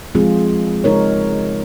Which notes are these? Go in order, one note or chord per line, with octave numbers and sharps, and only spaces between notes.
F3 G#3 C4 F4 G#4
C#3 G#3 D#4 A#4 C#5